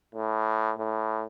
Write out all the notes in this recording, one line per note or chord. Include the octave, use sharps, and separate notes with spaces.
A2
A2